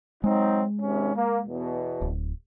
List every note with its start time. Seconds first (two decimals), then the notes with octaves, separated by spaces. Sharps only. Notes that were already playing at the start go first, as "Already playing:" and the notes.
0.24 F#3 G#3 C4 D#4
0.81 G#1 C3 C#4
1.14 A#3
1.47 E2 B2
2.02 D1